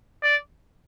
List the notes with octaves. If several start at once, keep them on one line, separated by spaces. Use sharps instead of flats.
D5